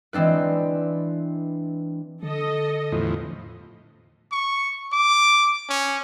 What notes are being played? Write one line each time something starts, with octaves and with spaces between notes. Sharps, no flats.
E3 G#3 C4 D4 B4
D3 A4 D#5
E2 A2 F3
C#6
D6
C#4